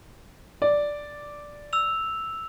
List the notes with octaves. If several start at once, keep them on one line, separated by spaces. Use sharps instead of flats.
D5
E6 F7